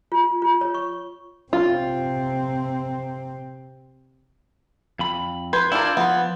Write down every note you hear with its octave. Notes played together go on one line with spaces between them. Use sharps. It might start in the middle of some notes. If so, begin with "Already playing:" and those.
F4
F4
C#5
C#6
C3 C4 F4
F2 B5
B4 C6 G6 G#6
D4 E4 F4 A#4 D5
F3 B3